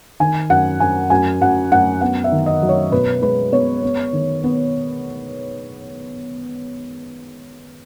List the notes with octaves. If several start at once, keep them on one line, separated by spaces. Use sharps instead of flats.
D#3 G#5
F#2 F#5
F#2 G#5
F#2 G#5
F#2 F#5
F#2 F#5
B3 F#5
E5
D#3
D#5
F#3
C#5
B2 B4
G#3 B4
B3 C#5
B3
D#3
B3